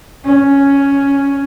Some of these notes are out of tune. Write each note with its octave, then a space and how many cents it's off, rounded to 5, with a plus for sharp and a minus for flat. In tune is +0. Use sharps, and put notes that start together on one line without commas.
C#4 +5